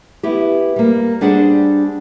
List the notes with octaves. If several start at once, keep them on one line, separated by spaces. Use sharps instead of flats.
B3 E4 G4
G3 A#3
G3 D4 G#4 C5 F#5